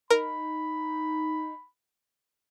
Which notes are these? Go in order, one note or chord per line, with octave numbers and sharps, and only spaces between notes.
D#4 A#4 B5